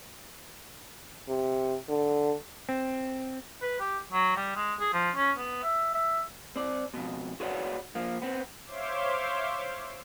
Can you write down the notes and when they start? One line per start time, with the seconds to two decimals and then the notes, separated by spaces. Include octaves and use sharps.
1.28 C3
1.89 D3
2.69 C4
3.62 B4
3.80 G4
4.12 F#3
4.37 G3
4.56 G#3
4.79 G#4
4.93 F3
5.16 C#4
5.38 B3
5.63 E5
5.95 E5
6.56 C4 D5
6.94 F2 B2
7.40 F#4 G#4 B4 C#5 D5 F#5
7.95 F3 A#3
8.22 B3 C4
8.66 C5 C#5 E5 F5 C6 D6